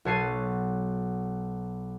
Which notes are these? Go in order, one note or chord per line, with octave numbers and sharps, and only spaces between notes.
B1 F#4 C#5 A5 C7 D#7